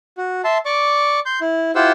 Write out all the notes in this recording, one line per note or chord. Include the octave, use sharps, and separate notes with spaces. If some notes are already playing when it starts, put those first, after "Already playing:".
F#4
E5 A5 C6
D5 C#6 D6
C6 G6
E4
E4 F4 G4 C5 F#5 E6